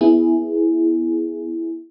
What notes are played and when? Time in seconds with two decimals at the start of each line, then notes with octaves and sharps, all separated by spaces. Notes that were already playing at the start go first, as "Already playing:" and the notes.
0.01 B3 E4 G#4